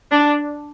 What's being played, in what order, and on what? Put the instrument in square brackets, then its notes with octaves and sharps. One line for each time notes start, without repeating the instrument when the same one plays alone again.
[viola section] D4